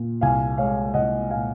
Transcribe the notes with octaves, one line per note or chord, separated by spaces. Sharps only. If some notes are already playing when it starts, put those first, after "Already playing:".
Already playing: A#2
C2 F5 G#5
G#3 C#5 F5
C2 D#5 F#5
A#2 F5 G#5